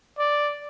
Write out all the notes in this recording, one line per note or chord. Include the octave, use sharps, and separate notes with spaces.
D5